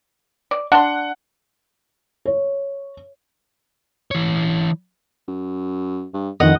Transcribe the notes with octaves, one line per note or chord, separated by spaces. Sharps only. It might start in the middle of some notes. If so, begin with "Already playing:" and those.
D5
D4 F#5 C6
C#5
E3 C#5
F#2
G2
A1 F2 D#3 D#5 F#5